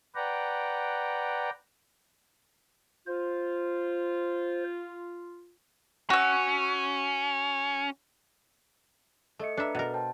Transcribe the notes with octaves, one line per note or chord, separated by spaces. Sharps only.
B4 D5 F#5 G5 A#5
F4 C5
C#4 F#4 E6
A3 A4 D#5 C#7
D4 A4 B4 E5 A#5
B2 A#4 A6
C5 G5 A5